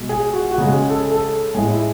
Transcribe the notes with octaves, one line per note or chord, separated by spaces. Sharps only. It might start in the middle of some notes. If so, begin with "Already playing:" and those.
Already playing: B2 G#3
G#4
F#4
F#4
C#3 G#3 G#4
G#4
A4
A4
A2 G#3 G#4
E4